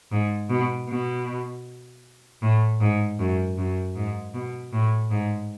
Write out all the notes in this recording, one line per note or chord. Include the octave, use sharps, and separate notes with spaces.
G#2
B2
B2
A2
G#2
F#2
F#2
G#2
B2
A2
G#2